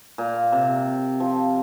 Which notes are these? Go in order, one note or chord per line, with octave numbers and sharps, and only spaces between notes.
A#2
C3
F3